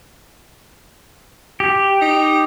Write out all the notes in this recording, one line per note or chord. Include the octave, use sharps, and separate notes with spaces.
G4
D#4